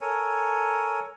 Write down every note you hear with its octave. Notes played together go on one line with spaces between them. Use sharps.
A4 A#4 C#5 G#5